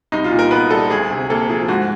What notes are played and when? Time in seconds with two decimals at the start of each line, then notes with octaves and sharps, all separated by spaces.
0.12 C2 D#4
0.24 F4
0.31 A#2
0.39 A#4
0.51 B3 B4
0.71 G3 A4
0.90 D2 G#4
1.11 C3
1.30 A#3 A4
1.49 F3 G#4
1.68 G#2 F#4